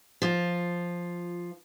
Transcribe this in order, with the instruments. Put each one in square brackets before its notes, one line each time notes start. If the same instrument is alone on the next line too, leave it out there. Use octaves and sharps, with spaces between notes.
[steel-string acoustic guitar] F3 F4